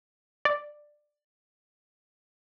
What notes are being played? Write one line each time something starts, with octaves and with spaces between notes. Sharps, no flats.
D5